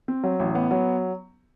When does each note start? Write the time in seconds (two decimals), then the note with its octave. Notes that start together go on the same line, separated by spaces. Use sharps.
0.08 C4
0.23 F#3
0.39 A1
0.55 B3
0.71 F#3